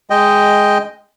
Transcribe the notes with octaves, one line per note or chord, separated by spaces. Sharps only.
G#3 D#5 G5